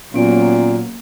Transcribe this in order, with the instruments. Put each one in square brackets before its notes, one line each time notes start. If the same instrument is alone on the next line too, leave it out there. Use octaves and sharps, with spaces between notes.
[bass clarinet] A#2 [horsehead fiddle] F#3 A#3 [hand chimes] B3 C#4 D7